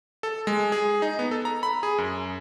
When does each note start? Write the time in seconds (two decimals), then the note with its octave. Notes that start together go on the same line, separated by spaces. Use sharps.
0.23 A4
0.47 G#3
0.72 G#4
1.02 D#4
1.19 B3
1.31 A4
1.45 A#5
1.63 B5
1.83 G#4
1.98 F#2